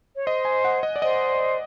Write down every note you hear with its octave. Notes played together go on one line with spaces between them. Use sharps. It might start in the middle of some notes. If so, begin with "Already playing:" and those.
C#5
C5 D#5
G#5
F#5
D#5
D5
C5 D#5